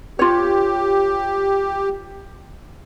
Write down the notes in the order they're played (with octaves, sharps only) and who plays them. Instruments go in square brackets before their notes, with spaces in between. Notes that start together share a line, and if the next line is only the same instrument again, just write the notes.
[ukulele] F4 C#5 [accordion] G4